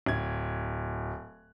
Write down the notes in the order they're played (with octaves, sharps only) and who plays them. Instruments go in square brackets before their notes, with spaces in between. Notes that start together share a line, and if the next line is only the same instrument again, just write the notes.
[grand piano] D1 G#6